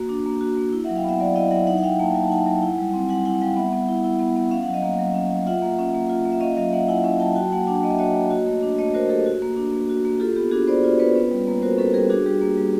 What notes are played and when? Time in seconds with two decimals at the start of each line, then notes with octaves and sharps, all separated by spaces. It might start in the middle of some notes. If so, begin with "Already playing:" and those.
Already playing: A#3 F#4
0.09 D4
0.26 A#3
0.41 F#4
0.57 A#3
0.72 E4
0.84 F#3 E5 F#5
0.96 F5 G5
1.04 B3 E5 F#5
1.20 F#3 D5 E5
1.36 E4 D#5 F5
1.51 F#3 E5 F#5
1.67 D#4 E5 F#5
1.78 F#5
1.83 F#3 F5 G5
2.00 A#3 G5 A5
2.14 F#3 G#5
2.24 A5
2.30 D#4 F#5 G#5
2.46 F#3
2.63 E4
2.78 G3
2.94 C4
3.09 G3 F#5 G#5
3.25 E4 F#5 G#5
3.41 G3 F5 G5
3.56 B3 E5 F#5
3.73 B3
3.88 E4
4.04 E4
4.20 B3
4.37 B3
4.51 C#4 F5
4.63 F#5
4.68 F#3
4.74 D#5 F5
4.83 A#3
4.99 F#3
5.14 C#4
5.30 F#3
5.47 F4 E5 F#5
5.62 A#3
5.79 C#4
5.94 A#3
6.10 F4
6.25 A#3
6.32 E5
6.41 C#4 D#5 F5
6.56 F#3 D#5 F5
6.72 A#3 E5 F#5
6.88 E4 F#5 G#5
7.04 C#4 F#5 G#5
7.20 F#3 G5 A5
7.35 F#4 G5 A5
7.52 A#3 F#5 G#5
7.67 D4 F#5 G#5
7.83 A#3 D#5
7.91 E5
7.99 F#4 C#5 D#5
8.14 A#3
8.30 F#4
8.46 A3
8.63 D4
8.78 A3 C#5 D#5
8.94 F#4 A#4 C5
9.09 A3 G4 A4
9.26 F#4
9.42 A#3
9.57 D4
9.73 A#3
9.89 F#4
10.05 A#3
10.20 F4 G4 A4
10.36 B3 G4
10.51 D4 F#4 G#4
10.67 B3 C5 D5
10.84 F4 C5 D5
10.99 B3 B4 C#5
11.15 C#4
11.31 G3
11.47 A#3
11.62 F#4 A#4 C5
11.78 C#4 A4 B4
11.94 G3 G#4 A#4
12.10 D4 F#4 G#4
12.26 G3 G4
12.41 A#3
12.57 G3